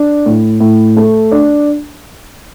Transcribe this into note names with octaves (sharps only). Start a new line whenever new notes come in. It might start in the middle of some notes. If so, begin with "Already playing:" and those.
Already playing: D4
A2
A2
A3
D4